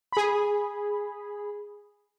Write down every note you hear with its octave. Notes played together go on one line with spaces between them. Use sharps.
G#4 B5